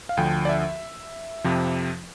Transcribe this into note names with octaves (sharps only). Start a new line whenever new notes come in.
F5
D2 D3 F3 G5
D5
E5
F2 C3 F3